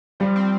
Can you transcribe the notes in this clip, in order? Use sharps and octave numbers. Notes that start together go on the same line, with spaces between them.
F3 G3
C4